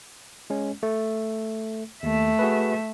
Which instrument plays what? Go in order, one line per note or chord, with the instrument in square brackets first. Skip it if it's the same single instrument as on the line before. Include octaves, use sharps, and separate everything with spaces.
[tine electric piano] G#3 C#4
A3
[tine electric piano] D#2 [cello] A3 E5
[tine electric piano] F#4 G#4 B4